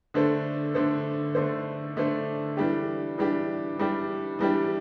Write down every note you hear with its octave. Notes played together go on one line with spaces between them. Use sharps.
D3 A3 D4 A4 C5
D3 A3 D4 A4 C5
D3 A3 D4 A4 C5
D3 A3 D4 A4 C5
E3 G3 D4 G4
E3 G3 D4 G4
E3 G3 D4 G4
E3 G3 D4 G4